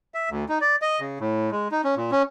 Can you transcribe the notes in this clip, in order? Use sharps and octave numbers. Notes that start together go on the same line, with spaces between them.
E5
D2
D#4
D5
D#5
C#3
A2
G#3
D#4
C#4
A#2
C#4